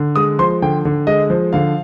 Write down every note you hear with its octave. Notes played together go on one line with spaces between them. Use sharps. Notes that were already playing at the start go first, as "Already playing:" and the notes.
Already playing: D3
G#3 D#6
F3 C6
D3 G5
D3
G#3 D#5
F3
D3 F5